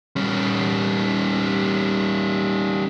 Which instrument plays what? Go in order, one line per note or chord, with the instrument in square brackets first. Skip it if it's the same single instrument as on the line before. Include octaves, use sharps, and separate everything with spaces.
[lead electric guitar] G3 C#4